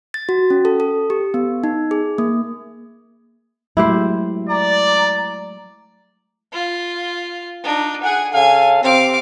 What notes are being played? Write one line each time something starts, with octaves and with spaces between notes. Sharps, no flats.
A6
F#4
C#4
A4
A4
G4
B3
D#4
G#4
A#3
F#3 G#3 A3 E4 G4 C5
D5 A#5
F4
D4 D#4
G#4 F#5 G#5
C#3 A4 F5 G#5
C3 C4 F5 D6